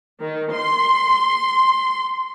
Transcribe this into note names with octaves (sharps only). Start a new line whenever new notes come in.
D#3
C6